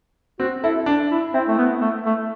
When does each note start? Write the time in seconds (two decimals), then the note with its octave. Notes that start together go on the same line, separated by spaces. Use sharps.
0.39 C4 F#4
0.63 E4 A4
0.86 D4
1.11 E4
1.33 C4 E4
1.48 A3
1.58 B3
1.81 A3
2.06 A3